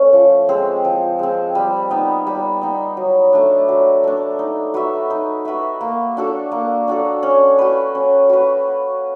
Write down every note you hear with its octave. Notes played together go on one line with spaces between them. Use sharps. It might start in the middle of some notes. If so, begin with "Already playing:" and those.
Already playing: A3 C#4
F3
G#3 C4
F3
G#3 C4
G3
B3 D#4
G3
B3 D#4
F#3
A3 D4
F#3
A3 D4
D#4
F#4 B4 E5
D#4
F#4 B4 E5
A#3
D4 F#4 A4
A#3
D4 F#4 A4
C#4
F#4 B4
C#4
F#4 B4